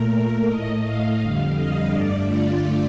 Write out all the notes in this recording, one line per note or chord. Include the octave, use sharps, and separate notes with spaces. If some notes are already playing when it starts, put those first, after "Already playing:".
Already playing: A#2 A3 A#4
A2 A3 D#5
F5
F2 D3 G3
D#5
G2 D3 A3 D5
F4